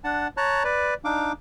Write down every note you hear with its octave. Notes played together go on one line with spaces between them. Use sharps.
D4 F#5 A5
C#5 A5 A#5 F#6
B4 D5
D4 D#4 F5 D6